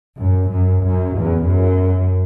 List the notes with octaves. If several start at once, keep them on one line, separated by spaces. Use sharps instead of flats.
F#2
F#2
F#2
E2
F#2